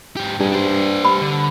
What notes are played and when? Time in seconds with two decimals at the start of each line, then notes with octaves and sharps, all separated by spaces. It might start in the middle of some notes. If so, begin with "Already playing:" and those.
0.17 G#2 G4
0.39 G2 A#2 G#4
0.52 D4 C5
1.05 B5
1.22 D3